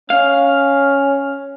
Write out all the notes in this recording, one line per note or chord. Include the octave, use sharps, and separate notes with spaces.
C#4 F5